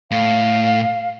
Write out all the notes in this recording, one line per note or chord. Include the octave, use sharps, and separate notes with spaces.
A2 F5